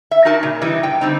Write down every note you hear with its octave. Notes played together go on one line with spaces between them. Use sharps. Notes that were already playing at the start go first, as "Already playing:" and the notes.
E5
D#4 F#4 A#4 A5
A#2 C#3
E3 G3 D#4
G2 G5
D3 G3 C4 D#4